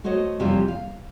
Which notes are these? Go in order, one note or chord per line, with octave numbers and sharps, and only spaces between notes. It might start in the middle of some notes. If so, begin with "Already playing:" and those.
A3 F#4 C5 C#5 D#5
F2 C3 E3 G3 C#4 F4
F5